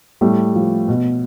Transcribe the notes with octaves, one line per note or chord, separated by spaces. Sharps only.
A2 G3 A3
F3
B2